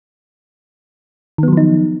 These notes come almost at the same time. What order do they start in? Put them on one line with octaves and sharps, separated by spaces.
D#3 B3 F#3 F3 D#4